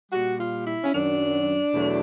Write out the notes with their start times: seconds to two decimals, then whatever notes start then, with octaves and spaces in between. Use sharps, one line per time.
0.11 A#2 G3 F#4
0.39 F4
0.65 E4
0.84 C#4
0.92 F#2 D#3 F#3 D4
1.73 E2 B2 F#3 A3